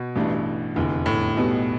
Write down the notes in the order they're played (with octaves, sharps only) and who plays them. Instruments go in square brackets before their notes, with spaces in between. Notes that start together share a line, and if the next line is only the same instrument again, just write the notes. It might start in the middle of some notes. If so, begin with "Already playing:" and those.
Already playing: [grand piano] B2
[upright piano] A1 G2 E3 A3 D4
F1 E2 D3
[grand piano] A2
[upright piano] B1 B2 G3 B3